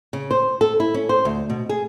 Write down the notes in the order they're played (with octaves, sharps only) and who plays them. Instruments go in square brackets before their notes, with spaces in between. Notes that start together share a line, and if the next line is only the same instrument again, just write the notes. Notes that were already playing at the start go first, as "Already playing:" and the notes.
[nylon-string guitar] C#3
C5
A4
E4
C#4
C5
D2
B2
G#4